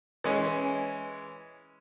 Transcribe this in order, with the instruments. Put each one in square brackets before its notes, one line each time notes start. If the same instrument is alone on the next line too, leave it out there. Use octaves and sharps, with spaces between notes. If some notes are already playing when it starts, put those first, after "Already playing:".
[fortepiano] E3 G#3 C#4